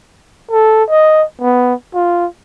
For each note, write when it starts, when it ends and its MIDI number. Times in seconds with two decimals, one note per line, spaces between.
0.51 0.83 69
0.89 1.24 75
1.41 1.74 59
1.94 2.26 65